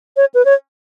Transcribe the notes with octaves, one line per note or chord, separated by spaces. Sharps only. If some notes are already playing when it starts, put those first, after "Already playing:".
C#5
B4
C#5